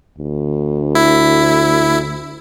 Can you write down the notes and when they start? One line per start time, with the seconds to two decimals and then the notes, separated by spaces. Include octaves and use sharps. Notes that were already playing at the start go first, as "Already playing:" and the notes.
0.18 D2
0.95 E4